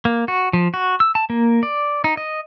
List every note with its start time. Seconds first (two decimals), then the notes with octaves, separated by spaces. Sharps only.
0.05 A#3
0.28 F#4
0.53 F3
0.74 F#4
1.00 E6
1.15 A5
1.30 A#3
1.63 D5
2.04 D#4
2.17 D#5